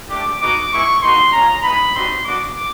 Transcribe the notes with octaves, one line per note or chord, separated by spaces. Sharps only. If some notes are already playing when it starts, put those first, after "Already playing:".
A3 D4 G4 D6
G#3 B3 D#4 F#4 D6
G#3 B3 E4 C#6
A#3 D#4 F#4 C6
G#3 C#4 F4 A#5
G#3 B3 D#4 B5
G3 C4 D#4 F#4 C6
B3 D4 F#4 D6